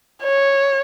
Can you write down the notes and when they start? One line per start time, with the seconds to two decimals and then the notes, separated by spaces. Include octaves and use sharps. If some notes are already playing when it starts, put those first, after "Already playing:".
0.23 C#5